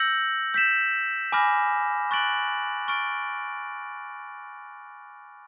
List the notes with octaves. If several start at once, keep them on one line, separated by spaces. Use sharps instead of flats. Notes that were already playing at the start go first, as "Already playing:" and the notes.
Already playing: E6 G6 A#6 C#7 F#7
G6 B6 E7
G#5 B5 D6 F6 A#6
C#6 F#6 A6 D7 F#7
C#6 F6 A6 D7